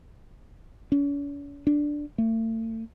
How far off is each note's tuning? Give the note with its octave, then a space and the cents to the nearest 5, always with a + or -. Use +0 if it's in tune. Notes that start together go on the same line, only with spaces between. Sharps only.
C#4 +45
D4 +0
A3 +40